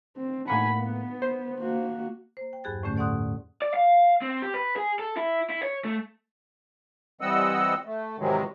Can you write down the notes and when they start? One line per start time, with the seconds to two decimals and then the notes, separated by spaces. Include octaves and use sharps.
0.17 C4
0.48 A2 A#3 F#5 G#5 B5
0.78 B3
1.22 C5
1.61 A#3 F#4
2.37 A#3 C5
2.53 G5
2.64 E2 G2 F#3 G#4 F#6 A6
2.83 E2 A2 D3 A3 C#4 G6
2.97 A4 D5 F#5 C6 D#6 F#6
3.62 D5
3.74 F5
4.22 C4
4.42 G4
4.54 B4
4.76 G#4
4.99 A4
5.17 E4
5.50 E4
5.63 C#5
5.85 A3
7.21 E3 G3 C4 D#5 F#5 E6
7.85 A3
8.19 G#2 C3 D#3 E3 F#3 G#3